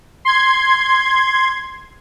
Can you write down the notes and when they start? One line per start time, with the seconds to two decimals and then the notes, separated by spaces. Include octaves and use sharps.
0.25 C6 G#6